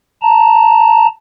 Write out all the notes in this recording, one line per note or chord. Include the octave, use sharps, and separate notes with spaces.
A5 A#5